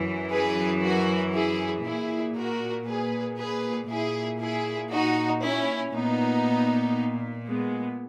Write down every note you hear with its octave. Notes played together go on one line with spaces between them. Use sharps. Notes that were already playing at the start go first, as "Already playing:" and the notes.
Already playing: F#2 E3
G#4 B4
F#4 A#4
E4 G#4
A#2 E4 G#4
F#4 A#4
G#4 B4
G#4 B4
A#2 E4 G#4
E4 G#4
D#4 F#4
C#4 E4
A#2 B3 D#4
G#3 B3